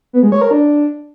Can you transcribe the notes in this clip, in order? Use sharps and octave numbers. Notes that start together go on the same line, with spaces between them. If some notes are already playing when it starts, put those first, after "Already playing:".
B3
G#3
C#5
A#4
D4